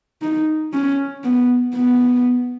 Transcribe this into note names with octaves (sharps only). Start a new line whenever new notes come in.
D#4
C#4
B3
B3